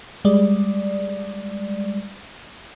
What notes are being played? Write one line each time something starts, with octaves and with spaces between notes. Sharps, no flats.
G3 G#3 D5